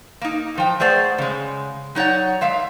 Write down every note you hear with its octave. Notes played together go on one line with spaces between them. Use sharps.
A#3 D#4
A2 F3 G5
A3 G#4 C5 D5 F#5
C#3 G#3
F#3 D#4 C#5 D5 F#5
G#3 E5 F5